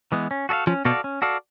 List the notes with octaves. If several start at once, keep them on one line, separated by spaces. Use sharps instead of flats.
E3 G#3 B3
C#4
F#4 A4 D5 F5
F3 C#4
B2 F#4 A4 D5 F5
C#4
F#4 A4 D5 F5